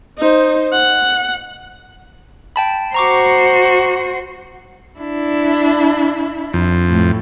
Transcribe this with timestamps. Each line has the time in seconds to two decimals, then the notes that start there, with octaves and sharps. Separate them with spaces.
0.18 D#4 C5
0.72 F#5
2.56 G5 A5 B5
2.94 F#4 C5 A#5 C#6 D6
4.99 D4 E4
6.53 F2
6.90 A2